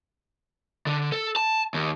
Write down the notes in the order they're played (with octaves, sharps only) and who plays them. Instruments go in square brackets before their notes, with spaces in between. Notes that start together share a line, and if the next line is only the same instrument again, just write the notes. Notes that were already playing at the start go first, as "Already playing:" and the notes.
[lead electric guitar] D3
A4
A5
D#2